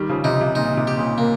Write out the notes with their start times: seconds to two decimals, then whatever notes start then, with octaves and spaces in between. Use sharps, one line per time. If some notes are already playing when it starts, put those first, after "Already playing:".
Already playing: D#3 G3
0.09 C#3 F3
0.24 C3 D#4
0.41 C3
0.55 A#2 D#4
0.77 C3
0.87 G4
0.97 A#2 C#3
1.18 A#3